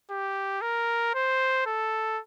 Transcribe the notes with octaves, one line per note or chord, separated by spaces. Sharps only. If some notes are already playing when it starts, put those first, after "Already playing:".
G4
A#4
C5
A4